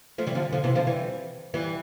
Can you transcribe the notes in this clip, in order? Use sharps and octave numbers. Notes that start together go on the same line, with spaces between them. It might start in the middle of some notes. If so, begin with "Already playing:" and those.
F3 A3
E3 G3
D3 F3
D3 F3
C3 E3
D3 F3
E3 G3
E3 G3